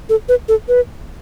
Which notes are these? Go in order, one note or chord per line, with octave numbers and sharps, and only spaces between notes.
A4
B4
A4
B4